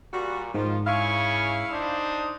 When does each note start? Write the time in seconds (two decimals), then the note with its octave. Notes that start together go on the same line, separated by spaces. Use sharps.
0.13 A#2 G3 F#4
0.54 G#2 D#3 F3 F4
0.87 C#3 E4 F5 G#5 C#6
1.71 D4 D#4 C5 D#6